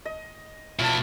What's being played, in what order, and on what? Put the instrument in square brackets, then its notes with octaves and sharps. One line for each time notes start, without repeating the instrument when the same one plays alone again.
[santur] D#5
[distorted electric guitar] B2 E4 [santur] F4 C#5 A5